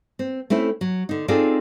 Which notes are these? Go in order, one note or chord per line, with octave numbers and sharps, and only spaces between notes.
C4
A3 C4 C#4 E4
F#3
D3 D#4
C4 D#4 F4 G#4 A4 D5